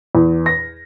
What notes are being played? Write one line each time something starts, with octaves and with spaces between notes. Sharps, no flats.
E2
A#6